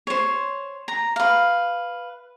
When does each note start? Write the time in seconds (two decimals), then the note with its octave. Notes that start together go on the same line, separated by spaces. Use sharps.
0.07 C5 C#5
0.88 A#5
1.16 B4 F5